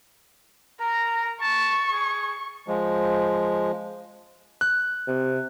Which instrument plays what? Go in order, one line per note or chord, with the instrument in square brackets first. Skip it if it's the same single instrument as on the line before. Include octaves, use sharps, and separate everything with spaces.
[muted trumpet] A#4 [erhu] A#5
[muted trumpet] A5 [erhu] C#6
[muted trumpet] G#4
[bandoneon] F3 G#3
[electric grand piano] F#6
[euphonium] C3